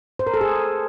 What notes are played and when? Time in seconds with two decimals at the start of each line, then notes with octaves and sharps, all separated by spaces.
0.19 C5
0.27 A#4
0.34 A4
0.41 G#4